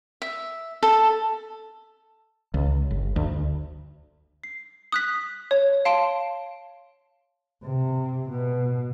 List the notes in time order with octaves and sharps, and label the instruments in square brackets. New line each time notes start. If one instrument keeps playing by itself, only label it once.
[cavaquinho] E5
A4
[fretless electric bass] C#2
G1
D2
[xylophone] C7
D#6 F#6 B6
C#5
F5 A5 C6 D7
[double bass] C3
B2